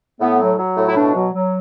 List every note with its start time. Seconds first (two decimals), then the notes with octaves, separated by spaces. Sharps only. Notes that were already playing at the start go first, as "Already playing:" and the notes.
0.21 A2 B3
0.40 F#3
0.58 F#3
0.77 A2
0.88 E4
0.97 B2 D4
1.15 F#3
1.34 F#3